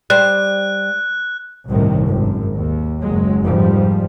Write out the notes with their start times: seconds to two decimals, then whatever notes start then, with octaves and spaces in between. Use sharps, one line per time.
0.10 G3 C5 F#6
1.68 G1 C2 A2 C3 D#3
2.08 G#1 F#2
2.56 D#2
3.03 F#1 F#3 G#3
3.45 F1 G#2 F3 G3